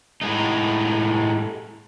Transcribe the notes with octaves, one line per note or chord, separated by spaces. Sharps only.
A2 G#3 D#4